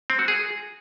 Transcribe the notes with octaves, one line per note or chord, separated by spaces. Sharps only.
C4
F#4
G#4